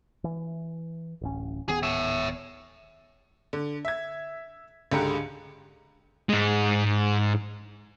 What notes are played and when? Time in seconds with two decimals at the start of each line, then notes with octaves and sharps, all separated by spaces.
0.24 E3
1.22 D1 A1 C#4
1.68 D1 D#3 B3 G#4
1.83 C#5 E5
3.53 D3
3.85 E5 G#6
4.92 C#2 G#2 D3 G4 A#5 C#7
6.29 G#2 G#3